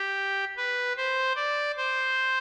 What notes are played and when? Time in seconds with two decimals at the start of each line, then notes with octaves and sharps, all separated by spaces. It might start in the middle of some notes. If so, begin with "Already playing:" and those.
Already playing: G4
0.57 B4
0.97 C5
1.36 D5
1.76 C5